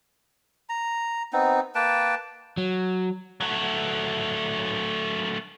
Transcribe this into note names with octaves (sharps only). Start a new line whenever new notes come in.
A#5
B3 C4 D#4
A#3 B4 G5 A5
F#3
F#3 A3